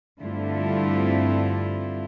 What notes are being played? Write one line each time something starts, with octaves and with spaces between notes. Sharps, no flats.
G2 D3 A3 C4 E4 F4